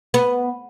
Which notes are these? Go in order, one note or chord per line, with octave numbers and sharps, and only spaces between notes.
B3